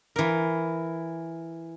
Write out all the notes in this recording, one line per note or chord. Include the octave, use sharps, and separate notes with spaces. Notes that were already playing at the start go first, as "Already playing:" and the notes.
E3 A#4